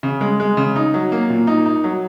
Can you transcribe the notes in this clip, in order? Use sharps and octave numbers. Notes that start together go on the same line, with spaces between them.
C#3
G#3
G#3
C#3
D#4
F#3
A#3
A#2
D#4
D#4
F#3